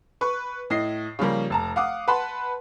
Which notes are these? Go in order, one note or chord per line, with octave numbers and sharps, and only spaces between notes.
B4 C#6
A2 D#5 C7
C#3 F3 G3 A#3
F1 A5 A#5
F5 F#5 D6 D#6
B4 F#5 A5 B5 C6